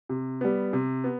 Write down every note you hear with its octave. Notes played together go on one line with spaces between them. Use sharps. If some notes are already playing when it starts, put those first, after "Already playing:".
C3
G3 B3
C3
B3